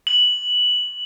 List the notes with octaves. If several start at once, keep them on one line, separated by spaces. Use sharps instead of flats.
F#7